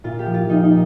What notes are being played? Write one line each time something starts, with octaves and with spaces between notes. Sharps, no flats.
A#2 F4
G4
F3
F4
A#2 D#4
D#4